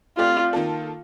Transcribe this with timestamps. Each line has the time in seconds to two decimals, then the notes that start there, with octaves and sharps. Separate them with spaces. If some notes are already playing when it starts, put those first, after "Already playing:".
0.18 A3 C4 F4 G4 D5
0.53 D#3 A#3 F4 A4